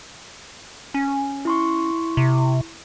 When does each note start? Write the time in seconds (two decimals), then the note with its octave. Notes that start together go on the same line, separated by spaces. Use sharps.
0.94 C#4
1.45 E4 C6 C#6
2.17 C3